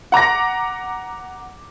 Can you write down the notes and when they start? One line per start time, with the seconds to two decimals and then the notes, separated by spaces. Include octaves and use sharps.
0.12 F#5 A#5 D6 A#6